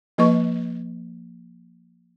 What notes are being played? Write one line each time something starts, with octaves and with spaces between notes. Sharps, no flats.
F3 A#3 B4 D#5 C#6